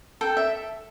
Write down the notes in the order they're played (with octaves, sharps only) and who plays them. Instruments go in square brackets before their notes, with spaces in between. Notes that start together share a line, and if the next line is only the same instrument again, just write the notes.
[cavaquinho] A4 G5
E5